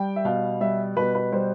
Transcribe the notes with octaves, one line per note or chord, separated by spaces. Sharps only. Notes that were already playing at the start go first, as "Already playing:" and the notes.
Already playing: G3 G5
E5
B2 F5
G3 E5
B2 B4
B4
G3 C5